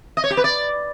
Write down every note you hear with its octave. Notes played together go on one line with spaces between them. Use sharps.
D#5
C#5
G4
B4
D5